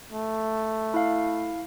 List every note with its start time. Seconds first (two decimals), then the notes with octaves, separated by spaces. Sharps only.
0.13 A3
0.94 E4 F5